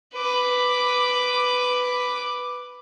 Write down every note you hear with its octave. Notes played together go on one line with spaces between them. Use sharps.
B4 D6